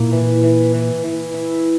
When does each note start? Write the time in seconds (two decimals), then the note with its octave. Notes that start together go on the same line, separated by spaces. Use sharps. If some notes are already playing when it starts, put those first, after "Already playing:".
Already playing: A#2 A#3 E4
0.12 E3
0.43 E3
0.73 E3
1.04 E3
1.34 E4